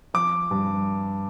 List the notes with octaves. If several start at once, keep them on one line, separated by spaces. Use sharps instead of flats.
F3 D6
G2